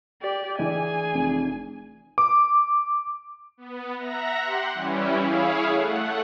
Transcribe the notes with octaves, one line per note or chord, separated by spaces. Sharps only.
G4 D5
E3 D4 G#4 G#5
F1
D6
B3
E5 F#5 A#5 A#6
G4 F#5 C6
E3 G3 C#4 E4
E4 G#4 C#5 F5
A3 F#5